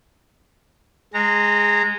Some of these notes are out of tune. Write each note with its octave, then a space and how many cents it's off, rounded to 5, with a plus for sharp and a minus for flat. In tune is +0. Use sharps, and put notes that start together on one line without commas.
G#3 -5 A#5 -25